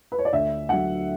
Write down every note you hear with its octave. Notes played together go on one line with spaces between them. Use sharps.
B4
C#5
D5
D2 E5
D3 F#3 F#5